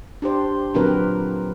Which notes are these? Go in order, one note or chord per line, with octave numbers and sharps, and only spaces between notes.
D4 G4 C5
A#2 D3 F#3 C4 A#4 B4